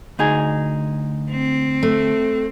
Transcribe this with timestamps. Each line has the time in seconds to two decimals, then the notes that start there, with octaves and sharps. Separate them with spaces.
0.19 D2 D#4 G#4
1.31 C4
1.83 A3